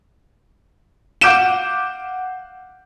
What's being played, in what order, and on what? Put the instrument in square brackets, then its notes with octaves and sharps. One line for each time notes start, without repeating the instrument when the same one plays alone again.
[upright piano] F5 F#5 D6 G6 D7 E7